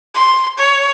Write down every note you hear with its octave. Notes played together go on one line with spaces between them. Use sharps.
C6
C#5